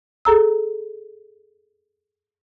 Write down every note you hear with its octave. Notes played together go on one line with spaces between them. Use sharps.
G#4 A4 A#5 E6